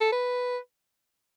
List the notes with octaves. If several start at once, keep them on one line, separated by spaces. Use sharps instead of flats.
A4
B4